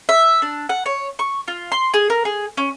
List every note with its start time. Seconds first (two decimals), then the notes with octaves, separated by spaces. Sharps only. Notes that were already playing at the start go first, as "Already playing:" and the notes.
0.09 E5
0.42 D4
0.69 F#5
0.86 C#5
1.19 C#6
1.48 F4
1.72 C6
1.94 G#4
2.10 A#4
2.25 G#4
2.57 C#4